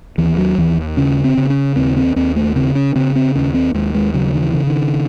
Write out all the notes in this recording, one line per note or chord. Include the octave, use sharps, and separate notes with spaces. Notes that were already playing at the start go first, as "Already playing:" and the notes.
D#2 E3
F#3
D#2 E3
C#3 C#4
C4
C#3
C#4
D#2 C4
C4
D#2 C4
A3
C#3 C4
C#4
C#3 C4
C4
D#2 C#4
C4
D#2 G#3
G#3
C#3 F#3
D#3
E3
C#3
D#3